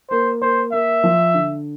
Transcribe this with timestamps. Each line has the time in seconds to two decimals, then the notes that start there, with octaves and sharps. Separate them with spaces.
0.11 A#3 C5
0.42 A#3 C5
0.72 A#3 E5
1.04 F3
1.34 D3